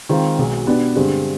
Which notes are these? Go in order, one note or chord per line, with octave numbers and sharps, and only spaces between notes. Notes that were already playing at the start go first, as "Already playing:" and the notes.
D#3 G#3 C4 F4
B1 B2 G#3
B2 B3 D4 G4
G2 D3 G#3 C4